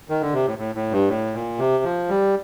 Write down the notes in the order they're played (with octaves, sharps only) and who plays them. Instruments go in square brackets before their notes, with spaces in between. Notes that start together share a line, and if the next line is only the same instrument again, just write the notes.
[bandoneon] D#3
D3
C3
A2
A2
A2
G2
A2
A#2
C3
F3
G3